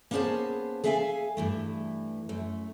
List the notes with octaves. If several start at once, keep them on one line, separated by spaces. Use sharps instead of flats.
A#3 B3 C#4 G#4 C5 A5
G#4 A4 E5 F5 G5 G#5
G2 E3 A3
F#2 A3